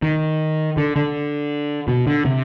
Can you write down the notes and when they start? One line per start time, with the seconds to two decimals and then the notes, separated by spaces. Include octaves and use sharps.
0.03 D#3
0.77 D3
0.96 D3
1.88 B2
2.07 D3
2.25 C3